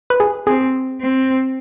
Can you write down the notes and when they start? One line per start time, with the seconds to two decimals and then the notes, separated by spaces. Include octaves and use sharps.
0.10 B4
0.20 G#4
0.47 C4 G#4
1.00 C4